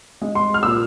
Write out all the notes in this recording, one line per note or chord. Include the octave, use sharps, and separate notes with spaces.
G#3
C6
F6
A#2 E6